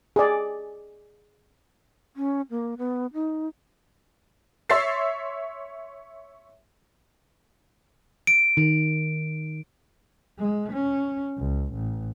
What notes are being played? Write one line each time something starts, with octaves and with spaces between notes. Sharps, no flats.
G#4 D5
C#4
A#3
B3
D#4
C#5 E5 C6 E6 A6 C7
D7
D#3
G#3
C#4
C#2
A1